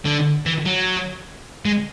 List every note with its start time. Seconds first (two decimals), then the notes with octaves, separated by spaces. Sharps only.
0.05 D3
0.46 E3
0.65 F#3
1.66 G#3